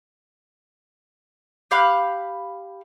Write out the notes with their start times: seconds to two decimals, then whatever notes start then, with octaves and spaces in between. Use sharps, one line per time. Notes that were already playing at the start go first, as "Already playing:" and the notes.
1.71 G4 F5 B5 F#6